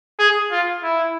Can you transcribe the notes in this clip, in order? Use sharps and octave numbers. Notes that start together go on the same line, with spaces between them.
G#4
F4
E4